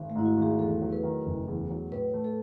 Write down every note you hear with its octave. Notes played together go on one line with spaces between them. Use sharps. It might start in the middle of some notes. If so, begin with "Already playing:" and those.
Already playing: G#1
A3
G#2 E4
F#4
G#1 G#4
E2 A4
F#3
B4
D#3
F#1
E2
F#3
A2 B4
A3
A4